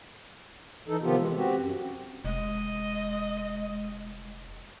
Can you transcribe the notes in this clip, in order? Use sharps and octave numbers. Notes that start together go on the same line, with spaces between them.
E3 D#4 A4
C3 D#3 F3 B3 F4 G4
E3 G#3
C4 F#4 G4
F#2
F1 G#3 D#5